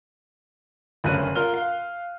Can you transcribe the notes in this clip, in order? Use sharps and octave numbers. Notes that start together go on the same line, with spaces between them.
F#1 D2 G2 C#4 F#6 D#7
F4 A#4 F6 G7
F5